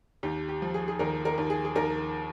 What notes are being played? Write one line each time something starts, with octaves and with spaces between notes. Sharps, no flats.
D#2 G4
G4
F3
G#4
G#4
D#2 A#4
A#4
D#2
G#4
G#4
D#2 A#4